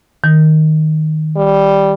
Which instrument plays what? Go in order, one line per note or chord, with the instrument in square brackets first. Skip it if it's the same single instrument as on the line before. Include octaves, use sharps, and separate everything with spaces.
[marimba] D#3
[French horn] G3